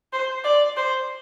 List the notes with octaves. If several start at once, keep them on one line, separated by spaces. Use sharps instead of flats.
C5
D5
C5